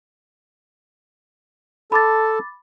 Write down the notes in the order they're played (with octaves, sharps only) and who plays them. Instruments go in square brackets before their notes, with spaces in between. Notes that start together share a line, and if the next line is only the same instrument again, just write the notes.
[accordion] A4 A5 [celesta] B5 D6 A6